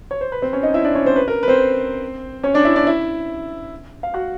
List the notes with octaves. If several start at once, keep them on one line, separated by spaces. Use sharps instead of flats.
C#5
C5
B4
C4 C5
C#4 C#5
D#4 D#5
E4 E5
D4 D5
C#4 C#5
C4 C5
B4
A#4
B4
C4 C5
C#4 C#5
D4 D5
E4 E5
D4 D5
E4 E5
F5
F#4 F#5